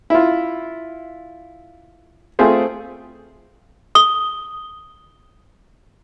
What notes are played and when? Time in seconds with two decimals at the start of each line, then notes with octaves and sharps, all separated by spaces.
0.10 E4 F4
2.39 A3 C4 F4 G#4 C5
3.95 D#6 G7